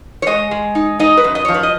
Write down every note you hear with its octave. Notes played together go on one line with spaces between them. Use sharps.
C#5
G#3 D#5
G#3
D#4
D#4 D#5
B4
F#2
D#5
F3 C#5
B4
D#5